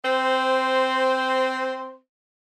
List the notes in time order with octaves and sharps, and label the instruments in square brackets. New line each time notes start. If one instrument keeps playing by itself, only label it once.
[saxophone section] C4 C5